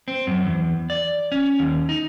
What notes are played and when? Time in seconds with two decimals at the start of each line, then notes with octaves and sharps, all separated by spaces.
0.08 C4
0.27 F#2
0.45 E2
0.90 D5
1.32 C#4
1.59 D#2
1.89 D#4